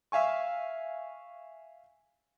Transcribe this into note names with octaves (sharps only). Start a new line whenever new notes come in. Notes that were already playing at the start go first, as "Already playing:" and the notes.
E5 F5 G#5 C#6